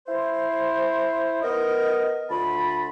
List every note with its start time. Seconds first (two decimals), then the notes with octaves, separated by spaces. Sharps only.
0.08 E4 C5
1.42 B3 A#4 D#5
2.30 D2 F4 A5 B5